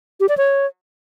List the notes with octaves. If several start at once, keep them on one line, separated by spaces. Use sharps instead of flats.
G4
D5
C#5